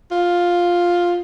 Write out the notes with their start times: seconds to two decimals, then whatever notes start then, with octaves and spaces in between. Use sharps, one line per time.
0.11 F4